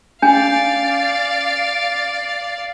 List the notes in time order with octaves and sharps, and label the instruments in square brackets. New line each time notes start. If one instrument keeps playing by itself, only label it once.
[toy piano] C#4 G#5 [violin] D5 F5